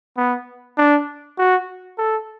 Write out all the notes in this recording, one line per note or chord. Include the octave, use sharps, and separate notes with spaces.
B3
D4
F#4
A4